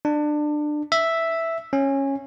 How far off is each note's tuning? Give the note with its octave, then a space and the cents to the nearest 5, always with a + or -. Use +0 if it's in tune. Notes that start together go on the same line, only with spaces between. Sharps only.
D4 +25
E5 +0
C#4 -15